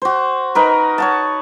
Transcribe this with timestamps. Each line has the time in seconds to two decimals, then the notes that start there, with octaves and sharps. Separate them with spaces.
0.02 F#4 C5
0.55 D#4 A#4 B4
0.98 C#5 F#5 A5